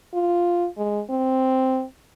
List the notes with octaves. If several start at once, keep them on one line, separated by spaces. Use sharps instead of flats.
F4
G#3
C4